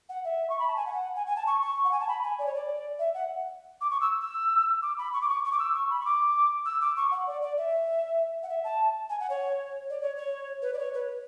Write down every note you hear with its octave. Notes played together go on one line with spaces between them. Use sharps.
F#5
E5
C#6
B5
A5
G#5
F#5
G#5
G#5
A5
C#6
C#6
F#5
G#5
A5
B5
G#5
D5
C#5
D5
E5
F#5
D6
C#6
E6
E6
D6
B5
C#6
D6
C#6
C#6
D6
E6
C#6
B5
C#6
D6
E6
D6
C#6
F#5
D5
D5
E5
F#5
E5
A5
G#5
F#5
C#5
D5
C#5
C#5
B4
D5
C#5
B4